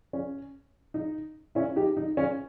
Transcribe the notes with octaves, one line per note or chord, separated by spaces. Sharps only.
C#4
D#4
C#4 E4
D#4 G4
D#4
C#4